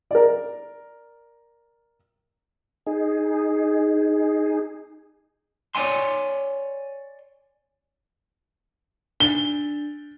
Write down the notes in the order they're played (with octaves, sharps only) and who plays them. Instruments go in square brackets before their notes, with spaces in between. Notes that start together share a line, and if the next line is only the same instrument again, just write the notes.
[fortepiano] A#4 D5
[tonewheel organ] D#4 G#4
[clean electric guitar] C#5 D5 F5 G5 G#5 C6
[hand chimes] D4 [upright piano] G7